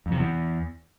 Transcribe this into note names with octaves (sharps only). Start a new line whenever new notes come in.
F2
C3
E2